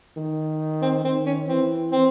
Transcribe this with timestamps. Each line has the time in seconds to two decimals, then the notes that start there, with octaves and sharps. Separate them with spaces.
0.16 D#3
0.82 C4
1.04 D#3 C4
1.26 C#4
1.47 E3 C4
1.92 C4